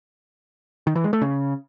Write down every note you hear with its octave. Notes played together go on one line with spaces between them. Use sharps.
D#3
E3
G#3
A3
C#3